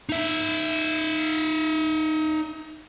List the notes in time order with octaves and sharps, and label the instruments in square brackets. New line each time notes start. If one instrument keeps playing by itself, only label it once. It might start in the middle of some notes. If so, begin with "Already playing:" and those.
[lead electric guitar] D#4 E5